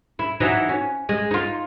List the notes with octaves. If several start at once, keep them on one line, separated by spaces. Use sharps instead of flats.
E4
E3 F#3 D#4
C#4
G#3
D#4 F4